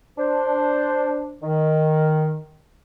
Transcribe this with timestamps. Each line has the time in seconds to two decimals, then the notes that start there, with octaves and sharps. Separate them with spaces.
0.19 D4 C5
1.42 D#3